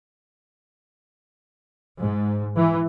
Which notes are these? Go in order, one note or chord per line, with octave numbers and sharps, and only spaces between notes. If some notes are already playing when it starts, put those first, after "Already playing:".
G#2
E3